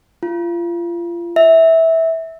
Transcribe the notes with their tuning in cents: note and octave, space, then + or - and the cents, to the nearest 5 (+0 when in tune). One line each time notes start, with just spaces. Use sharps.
F4 -30
E5 -15